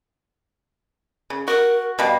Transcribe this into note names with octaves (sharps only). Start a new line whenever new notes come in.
C#3
F#4 A#4
B2 G3 F5